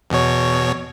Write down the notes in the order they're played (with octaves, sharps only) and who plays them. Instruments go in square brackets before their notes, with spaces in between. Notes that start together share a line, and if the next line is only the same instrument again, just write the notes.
[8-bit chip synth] E2 B2 C#5